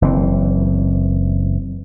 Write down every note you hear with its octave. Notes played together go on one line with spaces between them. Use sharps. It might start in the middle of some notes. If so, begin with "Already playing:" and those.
F#1 E3 C4